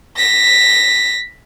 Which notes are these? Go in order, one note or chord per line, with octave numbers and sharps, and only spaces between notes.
A#6 B6